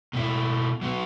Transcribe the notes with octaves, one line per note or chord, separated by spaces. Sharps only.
B2 A3 E4
F#3 B3 F#4